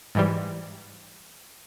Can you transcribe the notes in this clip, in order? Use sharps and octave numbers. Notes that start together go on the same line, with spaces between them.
G#2 E3 G3